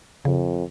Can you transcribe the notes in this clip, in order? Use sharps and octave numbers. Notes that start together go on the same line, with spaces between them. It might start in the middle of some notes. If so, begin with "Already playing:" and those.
F2 C#3